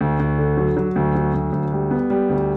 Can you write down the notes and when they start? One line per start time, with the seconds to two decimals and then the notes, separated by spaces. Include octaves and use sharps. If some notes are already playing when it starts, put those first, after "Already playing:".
0.01 D2
0.20 D2
0.39 D3
0.57 F#3
0.77 F#3
0.96 D2
1.15 F#3
1.34 D2
1.52 D2
1.72 G3
1.91 B3
2.10 G3
2.29 D2